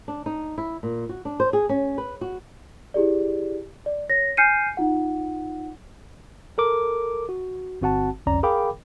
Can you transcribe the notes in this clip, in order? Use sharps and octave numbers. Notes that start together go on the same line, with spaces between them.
D4
D#4
E4
A#2
F#4
D4
C5
G#4
C#4
B4
F#4
E4 G4 G#4 D5
D5
C#5 A#6
G#5 F6 G6 C7 C#7 D#7
D#4 F4 F#5
A4 A#4 D6
F#4
G1 C4 F#4 F#5 A5
G1 C2 F2 C#4 D5 A#5
G#4 A#4 F5 G5 B5 D6